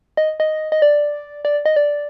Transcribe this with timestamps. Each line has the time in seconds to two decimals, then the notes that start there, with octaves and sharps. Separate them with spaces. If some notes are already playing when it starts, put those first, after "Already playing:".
0.17 D#5
0.40 D#5
0.72 D#5
0.82 D5
1.45 D5
1.66 D#5
1.76 D5